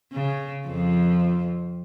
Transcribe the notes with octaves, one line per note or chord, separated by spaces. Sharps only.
C#3
F2 F3